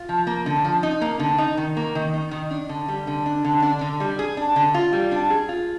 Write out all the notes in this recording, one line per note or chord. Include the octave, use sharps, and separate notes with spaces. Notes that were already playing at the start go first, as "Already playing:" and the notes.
Already playing: F4
F3
A#3
D3
F3
D#4
A#3
D3
D#4
D#3
A#3
D#3
D#4
D#3
D4
D3
G3
D3
D4
D3
D4
D3
G3
G#4
D4
D3
F4
G3
D4
G#4
F4